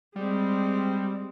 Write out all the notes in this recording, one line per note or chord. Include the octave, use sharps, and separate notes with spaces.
G3 G#3 C4